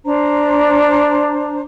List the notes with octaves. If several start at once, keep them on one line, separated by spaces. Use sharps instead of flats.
D4 C5 A#5